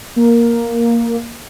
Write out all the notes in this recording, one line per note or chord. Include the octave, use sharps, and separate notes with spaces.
A#3